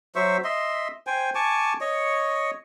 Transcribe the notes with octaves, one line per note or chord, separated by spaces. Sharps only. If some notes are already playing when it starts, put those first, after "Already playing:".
F#3 C5 E5 C#6
D#5 E5 C6
C5 G5 G#5
G#5 A5 C#6 D6
C#5 D#5 C#6